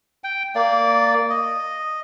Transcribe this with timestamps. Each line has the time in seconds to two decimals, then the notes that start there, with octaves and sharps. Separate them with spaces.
0.24 G5
0.55 A#3 D5
1.30 D#5